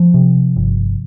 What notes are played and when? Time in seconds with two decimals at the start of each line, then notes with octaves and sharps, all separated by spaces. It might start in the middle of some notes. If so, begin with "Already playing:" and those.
Already playing: F3
0.14 C3
0.56 G1